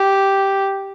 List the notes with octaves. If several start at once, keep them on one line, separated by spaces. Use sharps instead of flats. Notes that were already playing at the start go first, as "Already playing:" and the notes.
Already playing: G4